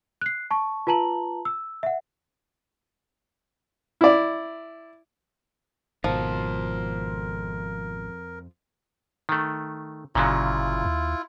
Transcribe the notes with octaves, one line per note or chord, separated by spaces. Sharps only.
F#6 C7
A5 C#6
F4 B4 A5 A#5 F#7
E6
E5 F#5
E4 D5
G#1 F2 B2 F3 A#4 C5
D#3 A3
G1 A#2 C#3 F#3 E4 F4
D#2